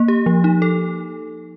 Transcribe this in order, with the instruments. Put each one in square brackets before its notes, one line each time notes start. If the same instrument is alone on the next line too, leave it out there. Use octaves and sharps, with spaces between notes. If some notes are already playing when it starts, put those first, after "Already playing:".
Already playing: [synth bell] A#3
G4
F3
D#4
A4